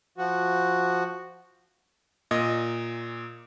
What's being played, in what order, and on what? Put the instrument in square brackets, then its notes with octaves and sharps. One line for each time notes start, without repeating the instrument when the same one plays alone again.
[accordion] F3 F#4
[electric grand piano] A#2 D#5 D#6